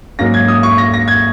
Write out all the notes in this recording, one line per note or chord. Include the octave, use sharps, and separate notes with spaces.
G#2 F#3 A#3 C#4 A#6
G#6
D#6
C#6
A#6
A#6
G#6